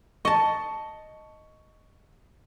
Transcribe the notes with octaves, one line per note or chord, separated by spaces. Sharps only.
D#5 A5 C#6